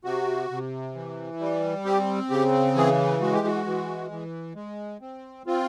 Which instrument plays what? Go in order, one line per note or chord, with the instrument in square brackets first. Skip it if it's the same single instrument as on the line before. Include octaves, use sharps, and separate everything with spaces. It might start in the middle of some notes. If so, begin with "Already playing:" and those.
[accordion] C3 F#4
C3
E3
G3
C4 G4
C#3 G4
E3 G#4
G#3 F#4
G4
F#4
E3
E3
G#3
C4
C4 F4